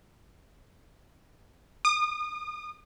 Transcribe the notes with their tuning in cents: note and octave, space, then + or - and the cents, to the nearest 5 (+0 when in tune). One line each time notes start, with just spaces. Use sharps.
D#6 -35